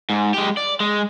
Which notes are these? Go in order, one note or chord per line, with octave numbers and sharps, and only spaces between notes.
G#2
G#3 G4
D5
G#3